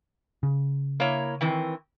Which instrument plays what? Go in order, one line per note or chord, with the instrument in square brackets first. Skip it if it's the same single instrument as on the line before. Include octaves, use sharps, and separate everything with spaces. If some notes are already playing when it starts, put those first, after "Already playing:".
[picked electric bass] C#3
[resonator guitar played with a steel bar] A#3 E4 C#5
D#3 E3 C4